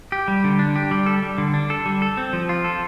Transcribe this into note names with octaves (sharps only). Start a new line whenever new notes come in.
G4
G3
D3
D4
G4
G3
A4
G3
D3
D4
A4
G3
A4
C4
F3
F4
A4